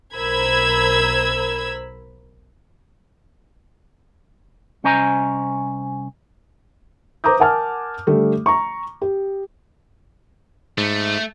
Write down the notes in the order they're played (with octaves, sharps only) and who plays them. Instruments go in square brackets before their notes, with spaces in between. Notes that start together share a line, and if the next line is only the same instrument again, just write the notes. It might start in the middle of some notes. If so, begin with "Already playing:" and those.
[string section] B1 A#4 C5 B5 E6 G#6
[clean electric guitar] C2 C#4 C5 D#5 G#5 A#5
[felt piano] B4 C5 A#5 D6 D#6 G6
A#4 F#5 G#5 A5 F6
D3 G3 A3
A#5 C#6
G4
[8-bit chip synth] G#2 [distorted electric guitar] A3